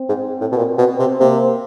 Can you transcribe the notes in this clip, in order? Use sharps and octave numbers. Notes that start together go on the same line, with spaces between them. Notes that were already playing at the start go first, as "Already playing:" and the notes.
Already playing: C4
G#2
A2
B2
A#2
B2
C3
C3 A#3